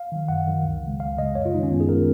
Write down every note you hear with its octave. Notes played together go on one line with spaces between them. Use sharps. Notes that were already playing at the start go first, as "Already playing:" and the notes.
Already playing: F5
D#3 F#3
F#2 F#5
D#3 F#3
C#2
C#3 G#3
C#2 F5
C#3 D#5
G#3
F#2 C#5
F4
D#3 G#3 D#4
C#4
F#2 B3
G#4
D#3 G#3 A#4